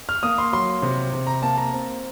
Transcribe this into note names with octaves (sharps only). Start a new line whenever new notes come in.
F6
A#3 D#6
C6
F#3 C6
C3
C3
A#5
A#3 A5
A#5
C4